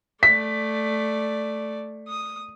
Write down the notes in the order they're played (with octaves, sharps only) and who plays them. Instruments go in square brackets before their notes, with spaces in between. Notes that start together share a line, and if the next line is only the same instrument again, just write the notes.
[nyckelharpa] A3 D5 [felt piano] B6
[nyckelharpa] D#6